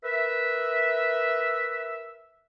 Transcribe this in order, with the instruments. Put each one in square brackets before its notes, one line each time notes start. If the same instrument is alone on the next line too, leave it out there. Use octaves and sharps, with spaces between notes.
[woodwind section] A#4 B4 E5